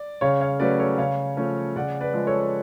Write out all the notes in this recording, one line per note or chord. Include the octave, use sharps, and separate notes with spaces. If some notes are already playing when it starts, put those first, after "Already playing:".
Already playing: D5
C#3 C#5 F5
C#5 F5
F#3 A3 C#4 B4 D5
A4 C#5
C#3 C#5 F5
F3 A3 C#4
C#3 D5 F#5
B4 D5
F3 G#3
A4 C#5